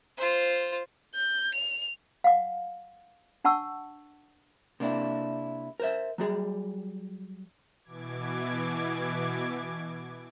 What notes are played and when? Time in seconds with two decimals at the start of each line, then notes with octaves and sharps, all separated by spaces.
0.17 F4 C5
1.15 G6
1.55 F7
2.24 F5 F#5 D6
3.44 D4 F#5 A5 C#6 E6
4.80 C3 A#3 D4 E4
5.80 A#4 C5 E5
6.18 F#3 G3 G#4
7.83 B2 E3 D6 G#6